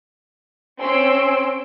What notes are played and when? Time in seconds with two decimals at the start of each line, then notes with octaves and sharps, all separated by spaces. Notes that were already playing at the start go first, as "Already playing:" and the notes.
0.80 C4 C#4 C6 E6 D7